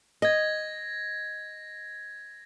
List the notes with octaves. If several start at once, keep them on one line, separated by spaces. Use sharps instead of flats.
D#5 G#6 A#6